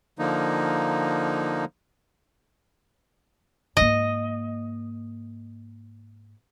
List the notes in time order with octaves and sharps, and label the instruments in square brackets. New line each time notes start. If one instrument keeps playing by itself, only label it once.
[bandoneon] D3 F3 A#3 D#4
[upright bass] G#2 A#3 [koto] D#5